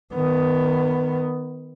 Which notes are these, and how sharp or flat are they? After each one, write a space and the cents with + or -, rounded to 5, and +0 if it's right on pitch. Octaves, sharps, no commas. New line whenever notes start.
D#3 -5 B3 +15